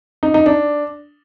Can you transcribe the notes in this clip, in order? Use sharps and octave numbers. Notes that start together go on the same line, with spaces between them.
D#4
D#4
D4